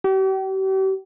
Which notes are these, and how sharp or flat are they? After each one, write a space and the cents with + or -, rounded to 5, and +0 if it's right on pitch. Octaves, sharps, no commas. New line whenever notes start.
G4 -40